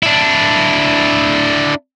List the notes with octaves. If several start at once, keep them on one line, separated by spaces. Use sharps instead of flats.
D4 E4